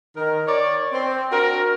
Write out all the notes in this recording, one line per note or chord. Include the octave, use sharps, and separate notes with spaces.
D#3 A#4
C#5 D5
C4
D4 F#4 A#4